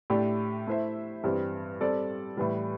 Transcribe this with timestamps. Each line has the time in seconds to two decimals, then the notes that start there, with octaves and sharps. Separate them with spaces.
0.10 A2 A3 D4 G4 D5
0.67 A3 E4 C5 E5
1.24 G2 E3 G3 C4
1.81 G3 C4 A4 D5
2.37 A2 E3 G3